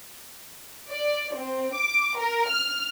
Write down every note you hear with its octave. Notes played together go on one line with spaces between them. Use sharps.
D5
C4
D6
A#4
F6